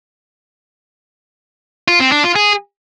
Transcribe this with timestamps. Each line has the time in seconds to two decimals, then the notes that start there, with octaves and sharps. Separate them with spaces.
1.88 F4
2.00 C4
2.12 D4
2.24 F4
2.36 G#4